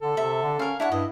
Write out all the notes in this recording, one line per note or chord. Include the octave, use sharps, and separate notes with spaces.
D3 A4
C3 E5
D3
C#4 A#4 F5
D4 E4 C#5 F#5
G2 E4 D#5